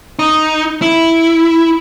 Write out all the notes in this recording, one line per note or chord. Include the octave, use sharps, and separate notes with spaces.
D#4
E4